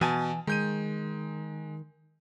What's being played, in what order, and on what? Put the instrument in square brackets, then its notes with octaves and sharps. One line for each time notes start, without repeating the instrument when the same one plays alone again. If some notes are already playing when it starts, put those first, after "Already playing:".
[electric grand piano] B2 [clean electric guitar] E3 G#5 A5
[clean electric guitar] D#3 [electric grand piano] G#3 G6 D#7